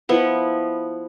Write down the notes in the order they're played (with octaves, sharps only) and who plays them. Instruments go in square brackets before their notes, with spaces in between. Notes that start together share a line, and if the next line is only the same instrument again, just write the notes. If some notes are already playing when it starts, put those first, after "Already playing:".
[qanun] F3 B3 E4